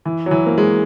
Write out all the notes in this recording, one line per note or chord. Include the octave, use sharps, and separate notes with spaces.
E3
F#3
E3
A#3
G#3